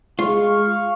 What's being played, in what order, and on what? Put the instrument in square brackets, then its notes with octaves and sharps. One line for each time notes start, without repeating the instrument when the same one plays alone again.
[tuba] G#3 [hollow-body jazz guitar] F4 [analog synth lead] F5 [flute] C#6